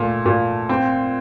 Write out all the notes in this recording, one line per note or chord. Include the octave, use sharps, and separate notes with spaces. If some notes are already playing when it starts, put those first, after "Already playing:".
Already playing: A#2 A3
A#2
C4